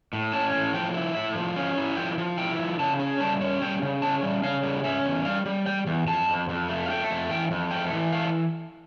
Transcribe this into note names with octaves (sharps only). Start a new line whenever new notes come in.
A2
C#4 A5
A2
F3 G5
E4
A2 E5
F3
C#4 F5
E4
F3 G5
F3
E4 G5
F3
C#3 A5
C#4
G3 A5
C#4
G3 G5
C#3
C#4 A5
G3
C#3 F5
G3
C#4 E5
E2
G3 F5
G3
G3 G5
E2
F2 A5
F2
F2
A3
F5
A3 G5
F2
E3 G5
F2
A3 G5
E3
A3 F5